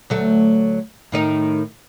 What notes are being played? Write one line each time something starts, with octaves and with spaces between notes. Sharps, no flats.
D2 F#3 A3
A2 D#3 D#4